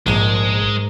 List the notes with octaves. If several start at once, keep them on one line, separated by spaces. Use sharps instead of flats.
A#1 G#2 G#3 A#4